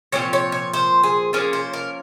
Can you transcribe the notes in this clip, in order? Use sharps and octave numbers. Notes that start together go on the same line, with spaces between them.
A#2 F3 C4 C#5
C#5
C#5
C5
G#4
F3 A#3 C#4 G#4
C5
A#4